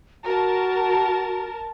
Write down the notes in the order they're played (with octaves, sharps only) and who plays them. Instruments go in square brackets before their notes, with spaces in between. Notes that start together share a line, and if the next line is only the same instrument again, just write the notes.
[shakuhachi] F#4 [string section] A#4 A5